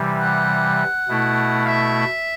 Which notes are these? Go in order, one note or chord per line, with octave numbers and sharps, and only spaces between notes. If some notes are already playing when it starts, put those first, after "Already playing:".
Already playing: C3 E3 G3
F#5
B2 A3 E4
E5